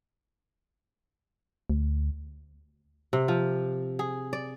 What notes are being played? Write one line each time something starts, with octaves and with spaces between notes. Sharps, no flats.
D2
C3
F3
G#4
D5